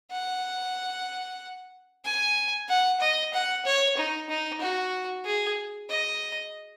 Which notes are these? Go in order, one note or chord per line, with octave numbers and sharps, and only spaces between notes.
F#5
G#5
F#5
D#5
F#5
C#5
D#4
D#4
F#4
G#4
D#5